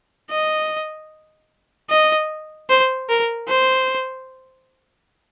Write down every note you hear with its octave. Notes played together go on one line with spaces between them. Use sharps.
D#5
D#5
C5
A#4
C5